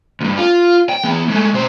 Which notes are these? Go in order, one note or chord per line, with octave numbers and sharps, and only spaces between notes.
D2 G2
F4
G5
E3 B3
G#3 A3
B2 C5